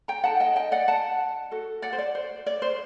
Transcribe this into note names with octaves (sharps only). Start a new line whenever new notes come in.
G5 A#5
D#4 A4 F#5 A5
D#5 G5
D#5 G5
D5 F#5
F#5 A5
F#4 A4
D5 F#5
C5
D5
C5
D5
C5